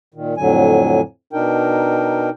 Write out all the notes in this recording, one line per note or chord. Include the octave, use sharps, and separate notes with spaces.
A#2 D#3
F2 A2 D3 F#3 G#5
B2 D4 D#4 A#4 G5